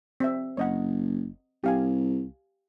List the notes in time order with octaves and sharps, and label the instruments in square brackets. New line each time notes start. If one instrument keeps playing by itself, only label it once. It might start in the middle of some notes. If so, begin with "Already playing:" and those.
[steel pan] C4 E5
[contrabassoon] F#1 [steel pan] C#5 D#5 F#5
[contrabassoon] C2 [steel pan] G4 F5 G#5